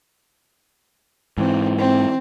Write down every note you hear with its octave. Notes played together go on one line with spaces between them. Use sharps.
G#2 E3 C4
C4